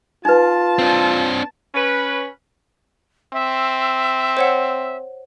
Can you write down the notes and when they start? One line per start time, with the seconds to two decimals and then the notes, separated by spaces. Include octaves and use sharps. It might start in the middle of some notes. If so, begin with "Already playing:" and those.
0.25 D#4 F4 B4 A5
0.79 C4 D4
1.74 C#4 B4
3.33 C4 E5
4.37 C5 C#5 F#5